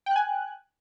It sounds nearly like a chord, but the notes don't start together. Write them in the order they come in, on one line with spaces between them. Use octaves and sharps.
G5 F#6 G#5